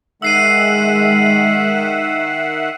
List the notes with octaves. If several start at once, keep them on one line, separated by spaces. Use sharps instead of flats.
D#3 G#3 E5 F#5 E6 C7 D#7